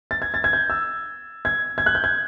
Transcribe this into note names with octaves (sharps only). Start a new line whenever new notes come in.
A6
G#6
A6
G#6
G6
E6
G#6
G#6
F#6
G6
G#6